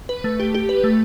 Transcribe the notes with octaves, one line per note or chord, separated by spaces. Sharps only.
B4
A3
G4
G4
B4
A3